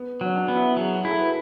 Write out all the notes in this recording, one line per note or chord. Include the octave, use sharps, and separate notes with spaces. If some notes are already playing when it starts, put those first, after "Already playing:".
Already playing: B3
F#3 C#4
D4
B3
E4
F#3 G#4
F#4
E4 G#4
A4
B4